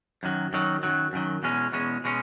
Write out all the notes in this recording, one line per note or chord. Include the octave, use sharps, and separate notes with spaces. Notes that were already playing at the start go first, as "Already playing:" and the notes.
F#2 D#3 F#3
F#2 D#3 F#3
F#2 D#3 F#3
F#2 D#3 F#3
E2 B2 G#3 C#4
E2 B2 G#3 C#4
B2 G#3 C#4